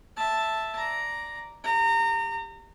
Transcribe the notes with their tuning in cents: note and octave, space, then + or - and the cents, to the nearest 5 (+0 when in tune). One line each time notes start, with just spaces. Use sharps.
E5 +0 A5 +0
D5 -5 A#5 +0
G4 +15 A#5 -30